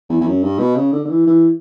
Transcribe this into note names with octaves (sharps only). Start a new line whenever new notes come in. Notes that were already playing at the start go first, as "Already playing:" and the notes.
E2
E2
F#2
G2
B2
C#3
D3
D3
E3
E3